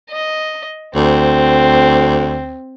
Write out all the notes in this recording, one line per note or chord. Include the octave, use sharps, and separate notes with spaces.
D#5
D2 C4